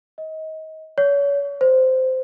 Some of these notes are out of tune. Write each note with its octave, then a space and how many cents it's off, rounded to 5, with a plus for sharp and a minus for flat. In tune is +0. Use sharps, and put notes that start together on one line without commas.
D#5 +25
C#5 +35
C5 -15